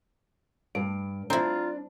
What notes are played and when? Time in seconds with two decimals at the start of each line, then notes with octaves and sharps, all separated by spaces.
0.75 G2 D7
1.30 C4 D4 E4 F4 A#5